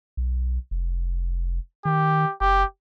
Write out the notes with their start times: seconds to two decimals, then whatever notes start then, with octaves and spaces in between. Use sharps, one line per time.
0.17 B1
0.71 F1
1.85 D#3 G4
2.41 F#1 G4